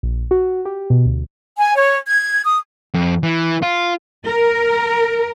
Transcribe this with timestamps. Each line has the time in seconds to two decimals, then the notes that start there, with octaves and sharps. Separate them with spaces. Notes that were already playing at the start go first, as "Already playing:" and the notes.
0.03 A#1
0.31 F#4
0.65 G4
0.90 B2
1.05 D2
1.58 G#5
1.75 C#5
2.06 G#6
2.43 D#6
2.94 F2
3.23 E3
3.62 F4
4.24 A#4